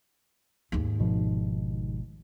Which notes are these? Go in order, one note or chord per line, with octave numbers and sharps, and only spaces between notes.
D#2 G#2
G#1 B2 F3